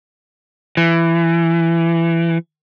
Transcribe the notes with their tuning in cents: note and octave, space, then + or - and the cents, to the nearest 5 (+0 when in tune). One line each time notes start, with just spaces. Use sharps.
E3 +20